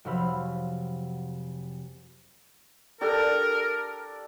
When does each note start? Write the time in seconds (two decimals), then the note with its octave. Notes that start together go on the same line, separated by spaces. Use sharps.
0.05 F1 F#3 C5 F5 B5 E6
3.01 D4 G4 A4 A#4